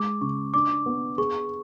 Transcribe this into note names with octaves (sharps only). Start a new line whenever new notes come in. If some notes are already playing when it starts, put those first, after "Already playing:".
Already playing: G#3 D6
C#3 C#6
D4 D6
B3
G#4 C#6